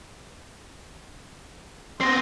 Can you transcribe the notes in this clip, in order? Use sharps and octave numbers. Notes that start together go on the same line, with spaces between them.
B3 C4 C6 A#6 C7